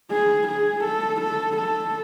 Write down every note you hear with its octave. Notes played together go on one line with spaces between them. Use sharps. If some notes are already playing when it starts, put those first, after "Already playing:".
G#4
G#4
A4
A4
A4